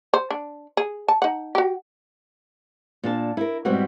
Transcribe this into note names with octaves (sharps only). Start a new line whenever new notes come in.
C5
D4
G#4
A5
D#4 F#5
F#4 G4
A#2 D4 A5
E4 A#4
G#2 B2 G3 C4 E4 F#4